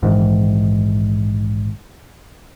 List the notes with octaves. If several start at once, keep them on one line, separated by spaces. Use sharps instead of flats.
A#1 G#2 D#3 E3